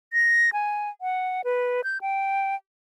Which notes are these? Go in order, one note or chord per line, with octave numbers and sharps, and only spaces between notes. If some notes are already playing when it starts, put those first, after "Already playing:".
A#6
G#5
F#5
B4
G6
G5